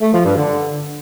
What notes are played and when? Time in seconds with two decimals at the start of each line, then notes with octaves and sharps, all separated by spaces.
0.01 A3
0.12 F3
0.24 G2
0.36 D3